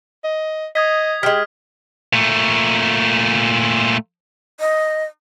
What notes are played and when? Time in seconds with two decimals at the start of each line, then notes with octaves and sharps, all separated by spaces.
0.24 D#5
0.75 D#5 D#6 G#6 B6
1.23 G3 G#3 G4 F6 B6
2.13 A#2 A3
4.60 D#5